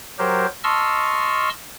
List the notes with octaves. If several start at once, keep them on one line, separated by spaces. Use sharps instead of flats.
F#3 G4 A#4 C5
D#5 A5 C6 C#6 E6 F6